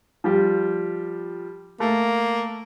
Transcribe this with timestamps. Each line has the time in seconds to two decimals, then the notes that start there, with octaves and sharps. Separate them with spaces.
0.24 F3 G3 G4
1.80 A3 A#3